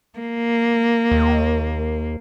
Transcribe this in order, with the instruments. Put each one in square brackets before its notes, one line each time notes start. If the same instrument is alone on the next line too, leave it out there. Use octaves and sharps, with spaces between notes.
[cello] A#3
[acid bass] D#2